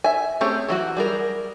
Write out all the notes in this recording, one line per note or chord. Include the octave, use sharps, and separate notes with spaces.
E5 G#5
A3 C4 C#4 G4 G#4
E3 F#3 F#4
G3 G#4 A#4